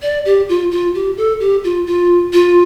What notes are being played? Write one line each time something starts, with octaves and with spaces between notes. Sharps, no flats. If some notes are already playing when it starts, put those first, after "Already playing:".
D5
G4
F4
F4
G4
A4
G4
F4
F4
F4